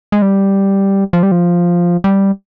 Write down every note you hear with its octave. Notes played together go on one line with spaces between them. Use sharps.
G#3
G3
F3
G3
F3
G3